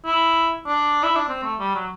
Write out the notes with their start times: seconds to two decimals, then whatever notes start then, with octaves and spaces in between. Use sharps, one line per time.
0.06 E4
0.67 D4
1.03 E4
1.15 D4
1.28 C4
1.44 A3
1.59 G3
1.75 F#3